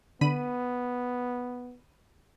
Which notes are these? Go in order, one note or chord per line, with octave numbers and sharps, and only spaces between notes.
D3 B3 B5 D#7